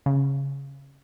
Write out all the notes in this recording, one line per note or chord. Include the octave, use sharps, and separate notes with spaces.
C#3